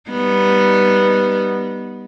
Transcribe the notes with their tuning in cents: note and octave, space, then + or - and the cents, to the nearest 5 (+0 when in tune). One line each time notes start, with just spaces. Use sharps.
G3 +0 B3 -10 D#4 +0